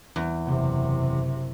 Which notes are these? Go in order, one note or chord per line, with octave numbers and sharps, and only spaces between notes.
E2
F#1 C3